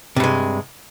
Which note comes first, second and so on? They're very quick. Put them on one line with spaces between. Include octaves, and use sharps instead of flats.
C3 G2 G#3